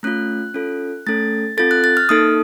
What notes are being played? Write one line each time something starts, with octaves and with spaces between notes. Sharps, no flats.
A3 C#4 F4 F#6
C#4 F4 A4
A3 C#4 A4 A6
C4 F4 A4 A6
F#6
A6
F6
A#3 D#4 A4 D#6